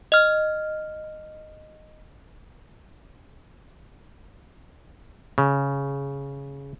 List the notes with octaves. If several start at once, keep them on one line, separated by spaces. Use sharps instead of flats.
D#5 F6
C#3